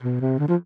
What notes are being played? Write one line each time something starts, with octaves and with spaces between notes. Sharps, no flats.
B2
C3
D3
F3